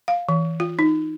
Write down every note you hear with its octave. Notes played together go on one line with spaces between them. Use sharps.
F5
E3
F4
D#4